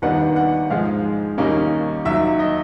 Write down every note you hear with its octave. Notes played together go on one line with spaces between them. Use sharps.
D#2 D#3 G3 B3 D4 F#5
F#5
G#2 F3 G#3 F5
D#2 D#3 G3 A#3 C#4 D#5
D#2 D#3 F#3 E5
D#5